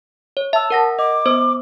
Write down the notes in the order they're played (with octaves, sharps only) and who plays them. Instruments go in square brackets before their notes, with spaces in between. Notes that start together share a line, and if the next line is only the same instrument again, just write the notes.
[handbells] C#5
[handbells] E5 E6 [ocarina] A5
[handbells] A#4 F#5 A#6
[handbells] D#5 [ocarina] D6
[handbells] B3 C5 D#6